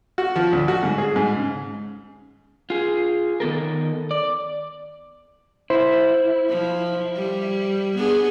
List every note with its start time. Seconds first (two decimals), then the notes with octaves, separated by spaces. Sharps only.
0.18 F#4
0.36 F3
0.52 D2
0.68 F#4
0.83 G#2
0.98 G#4
1.16 G#2
1.35 C#3
2.70 F4 G#4
3.40 D#3 B3 A4 A#4
4.11 D5
5.70 E4 C5
6.49 F3
7.16 G3
7.97 B3 D4 G#4